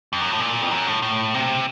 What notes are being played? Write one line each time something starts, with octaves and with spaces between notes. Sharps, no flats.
F2
F#2
A2
A#2
F2
F#2
A2
A2
C3